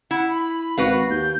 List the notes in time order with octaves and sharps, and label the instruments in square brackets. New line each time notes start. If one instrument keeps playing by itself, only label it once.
[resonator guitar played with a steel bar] E4 [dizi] F#5
[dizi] B5
[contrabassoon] G#1 [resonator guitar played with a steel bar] F#4 B4 F5
[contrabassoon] D#2 [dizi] G6